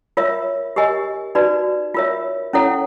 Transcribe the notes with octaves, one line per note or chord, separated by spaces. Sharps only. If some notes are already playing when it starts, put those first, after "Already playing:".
F4 A#4 C#5 E5
G4 A#4 D#5 G#5
D#4 F#4 B4 D5
F4 A#4 C#5 E5
C#4 E4 A4 C#5 F#5